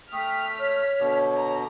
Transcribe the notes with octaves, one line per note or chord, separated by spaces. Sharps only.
A3 G5 D#6 F6 B6
C#5
B2 D3
A#5